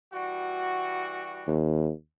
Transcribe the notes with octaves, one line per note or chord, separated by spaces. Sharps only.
E3 G3 F#4
D#2